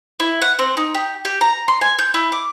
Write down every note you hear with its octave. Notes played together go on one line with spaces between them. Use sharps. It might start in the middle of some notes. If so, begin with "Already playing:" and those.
E4
F#5
C4
D#4
G4
G4
A#5
C6
G#5
G6
E4
D6